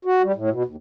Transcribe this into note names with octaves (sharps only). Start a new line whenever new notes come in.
F#4
G3
A2
B2
D#2